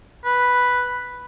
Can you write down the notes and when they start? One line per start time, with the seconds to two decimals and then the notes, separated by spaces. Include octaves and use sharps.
0.25 B4